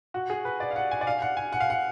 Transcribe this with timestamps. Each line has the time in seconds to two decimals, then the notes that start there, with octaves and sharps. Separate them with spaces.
0.14 F#4
0.30 G#4
0.45 B4
0.60 D5
0.71 F5
0.76 F#5
0.91 G#5
1.01 D5
1.07 F5
1.22 F#5
1.37 G#5
1.53 F#5
1.60 F5
1.70 F#5